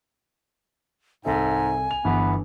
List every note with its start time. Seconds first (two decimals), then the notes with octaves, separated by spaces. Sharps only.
1.25 C2 G#2 A4 E5 G#5
1.91 F7
2.05 G1 E3 B3 B4